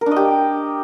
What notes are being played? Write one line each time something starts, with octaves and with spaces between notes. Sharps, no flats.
A#4
D4
D#5
G4